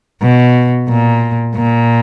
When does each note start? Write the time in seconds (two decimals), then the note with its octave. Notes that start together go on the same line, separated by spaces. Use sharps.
0.22 B2
0.89 A#2
1.56 A#2